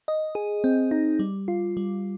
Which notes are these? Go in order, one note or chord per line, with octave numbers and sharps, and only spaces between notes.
D#5
G#4
C4
D#4
G3
F4
G3